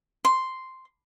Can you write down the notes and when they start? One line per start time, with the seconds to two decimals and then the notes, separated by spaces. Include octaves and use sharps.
0.25 C6